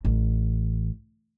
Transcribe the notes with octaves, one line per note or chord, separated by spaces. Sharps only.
A1